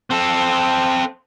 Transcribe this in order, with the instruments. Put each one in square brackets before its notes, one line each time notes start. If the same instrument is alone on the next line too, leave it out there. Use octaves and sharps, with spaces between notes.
[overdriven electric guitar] C4 A4